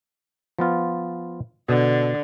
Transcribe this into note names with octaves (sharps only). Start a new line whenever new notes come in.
F3 B3 F4
B2 D3